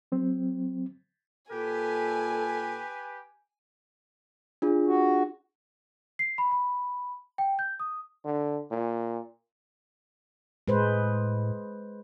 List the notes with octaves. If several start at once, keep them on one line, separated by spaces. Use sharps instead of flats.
F#3 C4
A#2 G4 A4 B4 G#5
D4 F4 G#4
F#4
C7
B5
B5
G5
G6
D#6
D3
A#2
A2 G#3 B4 C5